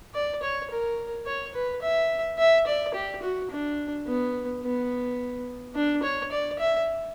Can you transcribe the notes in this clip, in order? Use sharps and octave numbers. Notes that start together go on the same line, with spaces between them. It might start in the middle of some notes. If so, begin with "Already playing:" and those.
D5
C#5
A#4
C#5
B4
E5
E5
D5
G4
F#4
D4
B3
B3
D4
C#5
D5
E5